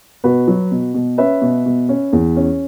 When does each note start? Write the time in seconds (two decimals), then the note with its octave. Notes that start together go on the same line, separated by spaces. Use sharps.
0.24 B2 F#4 B4
0.48 F#3
0.71 B2
0.94 B2
1.18 C#4 B4 E5
1.42 B2
1.66 B2
1.89 C#4
2.13 E2
2.36 C#4